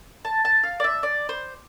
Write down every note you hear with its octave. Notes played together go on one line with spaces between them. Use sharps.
A5
A5
F5
D5
E5
D5
C5